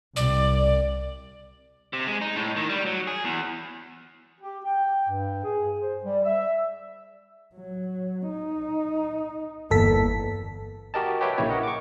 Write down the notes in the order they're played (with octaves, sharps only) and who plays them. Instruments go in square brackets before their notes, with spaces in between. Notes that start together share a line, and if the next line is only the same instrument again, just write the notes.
[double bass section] C2 [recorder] D5
[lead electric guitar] C3
G#3
D#4
A2
D#3
G3
F#3
G#4
E2
[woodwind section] G4
G5
G2
G#4
C5
G3
E5
[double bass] F#3
D#4
[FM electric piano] G1 A4 B6 [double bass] E2 A#3
[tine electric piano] F#4 G4 A#4 D#5 A5
G4 B4 C#5 E5 G5
A#1 C#3 A#3 E4 C#5 G5
A#4 D#5 F#5
C#6 D6